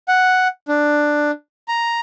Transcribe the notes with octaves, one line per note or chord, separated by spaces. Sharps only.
F#5
D4
A#5